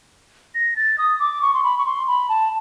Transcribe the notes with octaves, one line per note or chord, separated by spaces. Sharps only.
A#6
A6
D#6
D6
C#6
C6
B5
C#6
C6
B5
A5